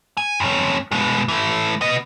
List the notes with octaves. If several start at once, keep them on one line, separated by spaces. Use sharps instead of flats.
G#5
F2 C#4
B2 G#3
E3 A3
B3 D#5